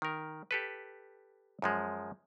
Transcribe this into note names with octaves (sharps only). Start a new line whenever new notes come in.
D#3 A#4
G4 A4 B4
F#2 F3 G#3